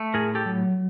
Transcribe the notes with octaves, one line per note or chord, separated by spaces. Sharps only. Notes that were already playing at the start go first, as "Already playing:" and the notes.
Already playing: A3
A2 G#4 A#4
G4 A4
F#3